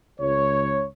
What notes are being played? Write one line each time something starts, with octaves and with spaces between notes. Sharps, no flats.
C#2 C#5